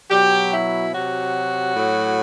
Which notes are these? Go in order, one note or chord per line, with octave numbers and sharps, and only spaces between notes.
B2 F#3 G4
E4
C3 F#3 F#4
A2 F#3